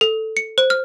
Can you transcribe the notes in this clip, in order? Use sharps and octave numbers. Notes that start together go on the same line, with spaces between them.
A4
C#7
C5
F6